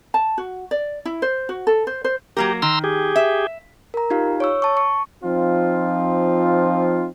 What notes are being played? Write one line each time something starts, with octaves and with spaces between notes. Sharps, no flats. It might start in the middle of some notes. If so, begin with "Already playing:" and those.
A5
F#4
D5
E4
C5
F#4
A4
C5
C5
F#3 A#3 G4 A#4
D#3 A#5 C6 E6
G4 G#4
E5
A#4 A#5
D#4 F4 G4 F5
C#5 C#6 E6
A5 C#6
C#6
F3 C4 D#4 F4